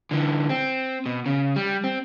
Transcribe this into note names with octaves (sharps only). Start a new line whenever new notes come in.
D3 E3
C4
B2
C#3
G3
C4